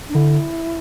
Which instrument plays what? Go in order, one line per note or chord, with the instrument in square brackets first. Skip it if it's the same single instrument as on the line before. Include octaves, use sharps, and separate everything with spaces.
[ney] D4
[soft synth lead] D3 [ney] E4